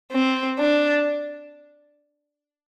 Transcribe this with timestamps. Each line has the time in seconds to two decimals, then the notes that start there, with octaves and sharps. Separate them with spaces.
0.12 C4
0.59 D4